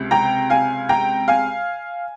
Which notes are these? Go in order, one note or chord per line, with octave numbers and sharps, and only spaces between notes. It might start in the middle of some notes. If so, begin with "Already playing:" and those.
Already playing: C#2 C3
G5 A#5
F5 G#5
G5 A#5
F5 G#5